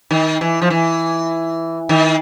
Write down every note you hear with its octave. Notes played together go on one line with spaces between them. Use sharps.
D#3
E3
F3
E3
D#3